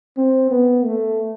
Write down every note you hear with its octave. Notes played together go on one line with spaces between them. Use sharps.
C4
B3
A3